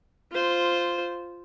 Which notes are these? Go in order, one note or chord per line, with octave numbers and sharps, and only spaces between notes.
F4 C5